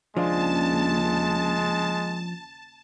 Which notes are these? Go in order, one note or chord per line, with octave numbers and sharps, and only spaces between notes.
D#2 C#3 F3 G#3 D4 F4 A5